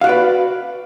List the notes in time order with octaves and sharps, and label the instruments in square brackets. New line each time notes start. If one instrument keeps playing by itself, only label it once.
[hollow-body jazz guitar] F5
F#4
D5
B4